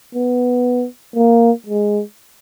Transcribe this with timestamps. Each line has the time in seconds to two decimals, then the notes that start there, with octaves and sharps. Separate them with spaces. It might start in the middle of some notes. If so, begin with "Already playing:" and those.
0.15 B3
1.16 A#3
1.66 G#3